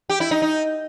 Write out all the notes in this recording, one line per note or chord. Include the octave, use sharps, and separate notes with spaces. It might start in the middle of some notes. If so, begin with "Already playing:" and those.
G4
E4
D#4
D#4